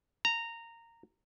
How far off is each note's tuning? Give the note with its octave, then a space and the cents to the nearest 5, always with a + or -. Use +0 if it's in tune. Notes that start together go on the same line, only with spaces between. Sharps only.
A#5 -15